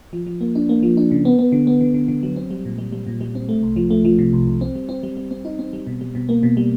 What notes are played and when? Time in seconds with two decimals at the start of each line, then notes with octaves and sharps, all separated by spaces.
0.13 F3
0.27 F3
0.41 A#3
0.55 D4
0.69 A#3
0.83 F3
0.97 D4
1.11 C#3
1.25 B3
1.39 B3
1.52 D3
1.67 B3
1.81 D3
1.94 D3
2.08 D3
2.23 F#3
2.36 C4
2.51 G3
2.65 A#2
2.78 G3
2.92 G3
3.07 A#2
3.21 G3
3.35 C4
3.49 A3
3.62 C2
3.76 F3
3.90 A3
4.05 F3
4.19 C3
4.33 C2
4.47 C2
4.61 C4
4.75 G3
4.89 C4
5.03 G3
5.17 G3
5.31 C4
5.45 D#4
5.59 C4
5.73 G3
5.87 B2
6.01 G3
6.15 B2
6.29 A#3
6.43 B2
6.57 G3